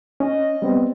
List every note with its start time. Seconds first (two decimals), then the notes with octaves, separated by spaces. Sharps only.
0.20 C#4 D#5
0.62 G3 B3 C4